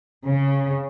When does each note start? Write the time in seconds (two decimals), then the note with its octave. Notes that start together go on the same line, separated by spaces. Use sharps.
0.24 C#3